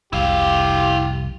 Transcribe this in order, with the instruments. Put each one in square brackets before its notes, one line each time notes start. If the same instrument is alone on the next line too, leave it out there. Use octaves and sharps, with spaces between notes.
[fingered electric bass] F1 C2 [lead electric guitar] E4 F5 [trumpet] G4